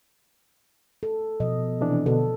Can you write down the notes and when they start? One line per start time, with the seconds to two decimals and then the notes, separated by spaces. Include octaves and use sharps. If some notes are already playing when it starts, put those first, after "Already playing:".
1.03 A4
1.40 B2 F3 D#5
1.81 C3 E3 D4
2.06 B2 D3 A4